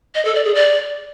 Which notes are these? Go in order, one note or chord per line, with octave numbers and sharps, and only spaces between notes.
D#5
A4
D5
G#4
D5